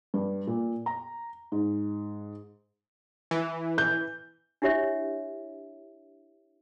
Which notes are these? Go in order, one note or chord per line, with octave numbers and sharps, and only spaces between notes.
G2
A#2
A#5
G#2
E3
G6
D4 E4 G4 C#5 E5